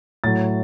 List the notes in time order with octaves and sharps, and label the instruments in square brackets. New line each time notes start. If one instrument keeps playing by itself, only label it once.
[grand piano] A2 F#3 A6